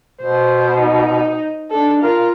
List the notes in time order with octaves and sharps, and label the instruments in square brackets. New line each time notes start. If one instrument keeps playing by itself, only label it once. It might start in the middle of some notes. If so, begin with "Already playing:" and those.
[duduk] B2 [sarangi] C5
[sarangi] D#4
[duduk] D4 [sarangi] A4
[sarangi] F4 [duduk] A#4